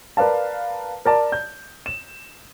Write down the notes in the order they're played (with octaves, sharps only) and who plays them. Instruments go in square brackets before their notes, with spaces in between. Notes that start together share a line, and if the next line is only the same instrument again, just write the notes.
[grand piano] A#4 B4 D5 F5 A5
A#4 D5 A5
G6
E7